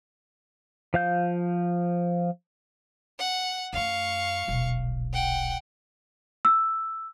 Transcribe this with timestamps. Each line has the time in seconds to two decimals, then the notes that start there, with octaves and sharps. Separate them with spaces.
0.94 F3 F5 G6
3.19 F#5
3.73 F#2 A3 F5 C#6
4.48 D#1 B1
5.13 F#5 G5
6.45 E6